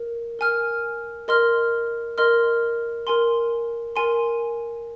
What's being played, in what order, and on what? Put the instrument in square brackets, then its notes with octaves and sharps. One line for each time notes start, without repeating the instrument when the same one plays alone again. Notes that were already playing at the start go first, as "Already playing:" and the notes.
Already playing: [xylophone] A#4
A#4 G#5 F6
A#4 D#5 C6 F6
A#4 D#5 C6 F6
A#4 G#5 C6
A#4 G#5 C6